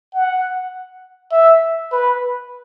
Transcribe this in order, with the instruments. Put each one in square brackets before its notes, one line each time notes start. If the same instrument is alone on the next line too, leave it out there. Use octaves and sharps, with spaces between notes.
[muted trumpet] F#5
E5
B4